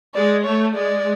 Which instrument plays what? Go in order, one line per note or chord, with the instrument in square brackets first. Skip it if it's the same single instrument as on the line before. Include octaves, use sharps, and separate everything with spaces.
[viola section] G#3 [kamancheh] D5
[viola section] A3 [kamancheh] C#5
[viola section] G#3 [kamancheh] D5